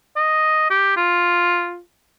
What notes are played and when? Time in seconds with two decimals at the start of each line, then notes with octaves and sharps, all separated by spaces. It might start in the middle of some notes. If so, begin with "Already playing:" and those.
0.16 D#5
0.70 G4
0.97 F4